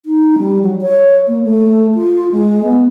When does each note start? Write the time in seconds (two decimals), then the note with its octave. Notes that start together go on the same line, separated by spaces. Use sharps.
0.06 D#4
0.38 G3
0.63 F#3
0.81 C#5
1.27 A#3
1.44 A3
1.95 F4
2.32 G#3
2.63 B3